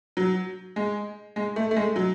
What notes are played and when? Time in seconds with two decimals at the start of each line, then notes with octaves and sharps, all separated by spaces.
0.17 F#3
0.76 G#3
1.36 G#3
1.56 A3
1.71 A3
1.76 G#3
1.96 F#3